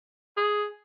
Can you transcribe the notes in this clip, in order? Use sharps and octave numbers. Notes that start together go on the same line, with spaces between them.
G#4